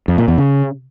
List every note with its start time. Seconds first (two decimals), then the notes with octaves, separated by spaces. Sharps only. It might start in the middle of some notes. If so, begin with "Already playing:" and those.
0.08 F2
0.18 A#2
0.28 E2
0.38 C#3